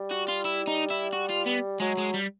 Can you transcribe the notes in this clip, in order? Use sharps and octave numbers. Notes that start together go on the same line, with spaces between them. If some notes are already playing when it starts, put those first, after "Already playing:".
Already playing: G3
F#4
F4
E4
D#4
E4
F#4
F4
B3
F#3 G#3
G#3
G3